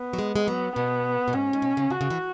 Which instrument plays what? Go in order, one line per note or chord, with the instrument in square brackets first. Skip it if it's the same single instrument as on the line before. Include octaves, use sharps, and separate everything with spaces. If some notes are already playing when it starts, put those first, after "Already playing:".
Already playing: [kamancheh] B3
[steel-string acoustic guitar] F#3
G#3
G#3
[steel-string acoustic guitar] F#3 [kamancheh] B3
[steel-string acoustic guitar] B2 [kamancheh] B3
[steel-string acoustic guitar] B2
[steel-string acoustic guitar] G#2 [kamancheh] C#4
[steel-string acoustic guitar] G#2
B2
C#3
[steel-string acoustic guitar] C#3 [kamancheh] F#4
[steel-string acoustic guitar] C#3
E3